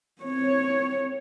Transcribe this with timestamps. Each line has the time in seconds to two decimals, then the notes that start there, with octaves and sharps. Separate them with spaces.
0.22 C4 C#5